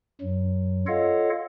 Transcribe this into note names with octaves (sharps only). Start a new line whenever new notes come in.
F#2 F#3
F4 A4 C#5 D#5 F5 F#5